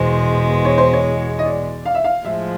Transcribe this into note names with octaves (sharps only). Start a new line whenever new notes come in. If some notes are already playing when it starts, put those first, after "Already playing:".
Already playing: E2 B2 G#3 C5
C#5
C5
C#5
D#5
D5
F5
E5
F5
A2 F3 G#3 E5